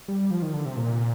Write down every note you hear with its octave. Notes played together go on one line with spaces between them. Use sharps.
G3
F3
D#3
D3
C3
A#2